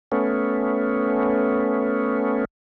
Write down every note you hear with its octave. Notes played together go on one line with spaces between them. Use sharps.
A3 B3 C#4